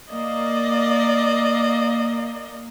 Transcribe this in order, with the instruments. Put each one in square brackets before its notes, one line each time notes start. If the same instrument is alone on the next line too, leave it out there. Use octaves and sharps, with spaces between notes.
[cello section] A#3 [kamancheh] D5 D#5